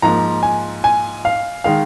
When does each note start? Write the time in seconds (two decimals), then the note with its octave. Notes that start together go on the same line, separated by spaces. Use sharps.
0.02 G#2 F3 A#3 A#5
0.43 G#5
0.84 G#5
1.25 F5
1.64 D#3 G#3 F5